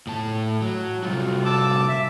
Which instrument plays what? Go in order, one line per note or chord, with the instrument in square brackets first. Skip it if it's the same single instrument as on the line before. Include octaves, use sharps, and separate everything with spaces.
[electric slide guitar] A2 A5
F#3
[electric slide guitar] C3 G3 F#4 [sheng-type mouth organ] F4
[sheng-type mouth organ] A5 D6 E6
E5